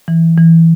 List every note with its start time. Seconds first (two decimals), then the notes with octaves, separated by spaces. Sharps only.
0.08 E3
0.38 E3